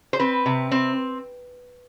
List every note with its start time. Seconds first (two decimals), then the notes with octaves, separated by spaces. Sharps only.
0.13 C5
0.20 C4 B4
0.46 C3
0.72 C4